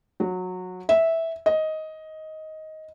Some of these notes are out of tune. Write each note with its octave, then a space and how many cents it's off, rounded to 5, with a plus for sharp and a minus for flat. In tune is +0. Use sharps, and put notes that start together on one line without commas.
F#3 -20
E5 -10
D#5 +10